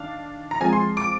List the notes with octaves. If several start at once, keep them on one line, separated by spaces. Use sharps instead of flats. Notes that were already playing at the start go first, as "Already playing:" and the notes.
Already playing: D#3 D4 F5
A#5
F3 G#3 C4 G#5
C6
D6